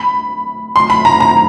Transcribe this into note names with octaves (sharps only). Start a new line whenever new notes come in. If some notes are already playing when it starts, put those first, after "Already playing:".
Already playing: B5
C6
B5
A#5
A#5